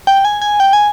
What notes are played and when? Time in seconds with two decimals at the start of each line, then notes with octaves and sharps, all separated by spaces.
0.07 G5
0.25 G#5
0.42 G#5
0.60 G5
0.73 G#5